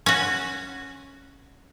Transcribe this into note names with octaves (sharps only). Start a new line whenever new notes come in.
C#4 F#4